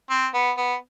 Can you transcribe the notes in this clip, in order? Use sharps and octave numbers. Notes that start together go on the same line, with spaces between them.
C4
B3
B3